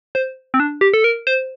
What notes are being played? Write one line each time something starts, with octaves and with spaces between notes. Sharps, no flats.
C5
C4
D4
G4
A4
A#4
C5